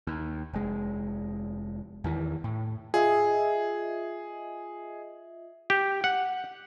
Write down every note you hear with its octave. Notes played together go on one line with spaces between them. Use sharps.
D#2
F1 G#3
E2 D#3 E3
A2
F4 G#4 D#5 E5
G4
F#5